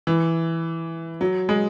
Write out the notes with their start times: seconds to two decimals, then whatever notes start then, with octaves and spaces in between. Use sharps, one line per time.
0.07 E3
1.21 F#3
1.49 G#3